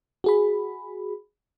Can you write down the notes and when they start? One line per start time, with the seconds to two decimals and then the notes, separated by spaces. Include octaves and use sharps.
0.24 F#4 G#4 B5